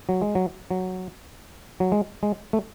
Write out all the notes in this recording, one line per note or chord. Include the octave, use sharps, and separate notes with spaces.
F#3
G#3
F#3
F#3
F#3
G#3
G#3
A3